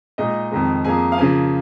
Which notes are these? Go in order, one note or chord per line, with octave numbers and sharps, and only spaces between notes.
A#2 G#3 D#4 D#5
F2 D#3 G#3
F2 F3 A#3 G#4 G#5
F5
C#3 F3 A#3 G#4 G#5